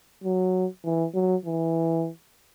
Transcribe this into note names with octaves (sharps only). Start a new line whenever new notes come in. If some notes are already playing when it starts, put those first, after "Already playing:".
F#3
E3
F#3
E3